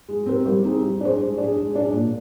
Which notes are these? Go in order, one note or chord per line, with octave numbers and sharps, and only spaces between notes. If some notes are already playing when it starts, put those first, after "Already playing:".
G#3
C4 G4 A#4
G3
C4 D#4 G#4
G3
D4 G#4 C5
G#3
D4 G#4
G#3
D4 G#4
A#2